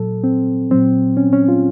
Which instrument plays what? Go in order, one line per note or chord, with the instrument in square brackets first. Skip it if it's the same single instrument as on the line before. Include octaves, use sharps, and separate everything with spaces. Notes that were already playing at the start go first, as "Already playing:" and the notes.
Already playing: [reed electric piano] A#2 F#3 A4
C4
A#2 F#3 C4
C#4
C#4
F4